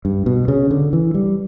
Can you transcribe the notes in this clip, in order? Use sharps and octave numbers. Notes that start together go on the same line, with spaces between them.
G2
B2
C#3
D3
E3
G3